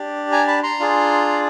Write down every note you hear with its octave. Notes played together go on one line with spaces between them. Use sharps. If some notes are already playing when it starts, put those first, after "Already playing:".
Already playing: D4 G4
G#5 A#5
A5 B5
A#5 C6
D4 F4 G#4